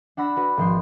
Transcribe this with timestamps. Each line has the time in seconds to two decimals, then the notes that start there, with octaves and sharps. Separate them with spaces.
0.17 D4 F#5 B5 E6 A#6
0.36 F#4 B4
0.57 G#1 F3 C6